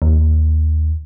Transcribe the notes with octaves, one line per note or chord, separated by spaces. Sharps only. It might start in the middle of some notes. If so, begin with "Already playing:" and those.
D#2